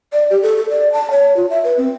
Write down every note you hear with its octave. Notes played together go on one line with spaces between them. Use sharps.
D5
G4
A4
A4
D5
A5
C#5
F4
E5
B4
C4